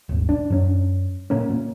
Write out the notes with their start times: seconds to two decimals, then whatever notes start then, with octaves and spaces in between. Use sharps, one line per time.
0.09 D#1 G#1
0.29 D4
0.50 F#2 C#4
1.30 A#2 A#3 C#4
1.50 A#2